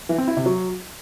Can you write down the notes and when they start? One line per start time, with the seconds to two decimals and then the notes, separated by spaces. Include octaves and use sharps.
0.09 E3
0.18 C4
0.28 E4
0.37 C3
0.46 F#3